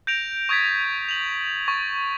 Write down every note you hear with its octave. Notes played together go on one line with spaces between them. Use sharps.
G6 A#6 D7 F7
C#6 D#6 G#6 A6 B6
F7 F#7
C#6 A6